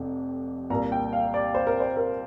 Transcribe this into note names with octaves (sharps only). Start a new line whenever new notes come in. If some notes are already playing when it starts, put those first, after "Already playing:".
Already playing: F1 F2 C3
C2 A#2 A#3 A#5
G5
F5
D5
C5
A#4
C5
A#4